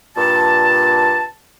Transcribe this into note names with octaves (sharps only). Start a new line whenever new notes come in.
G2 A#2 A5